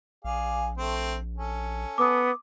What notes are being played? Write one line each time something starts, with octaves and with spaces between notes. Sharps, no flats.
A#1 G#4 D5 F5
A3 C4
C#4 A4
B3 D6 D#6